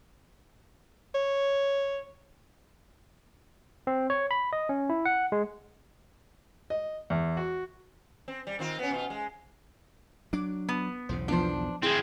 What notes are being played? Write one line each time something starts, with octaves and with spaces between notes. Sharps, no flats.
C#5
C4
C#5
B5
D#5
C#4
E4
F#5
G#3
D#5
E2
F#4
C4
G3
D#3 C4 F4
B3 C#4
B2 F4
G#3
F#3 D4 D6
B3
B1 E2 C#3 C5
F3 B3 D4 F4 C5
G#3 C4 E4 G#4